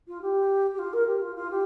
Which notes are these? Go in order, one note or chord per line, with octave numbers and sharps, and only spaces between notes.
F4
G4
G4
F4
A#4
G4
F4
F4
G4